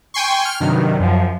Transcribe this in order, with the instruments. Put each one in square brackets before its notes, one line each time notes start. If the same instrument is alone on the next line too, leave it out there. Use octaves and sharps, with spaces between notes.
[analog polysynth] G5 G#5 C6 C#6
F6
G2 C3 D#3 F#3
F#2 F3